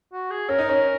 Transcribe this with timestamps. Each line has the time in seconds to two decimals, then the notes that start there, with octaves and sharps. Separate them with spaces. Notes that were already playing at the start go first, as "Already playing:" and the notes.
0.13 F#4
0.30 G#4
0.49 C#4 A#4
0.59 D#4
0.69 C#4